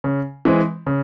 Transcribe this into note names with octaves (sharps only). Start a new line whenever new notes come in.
C#3
E3 G#3 C4
C#3